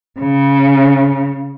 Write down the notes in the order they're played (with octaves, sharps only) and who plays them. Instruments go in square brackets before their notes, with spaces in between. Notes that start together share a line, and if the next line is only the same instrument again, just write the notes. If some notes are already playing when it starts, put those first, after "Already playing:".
[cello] C#3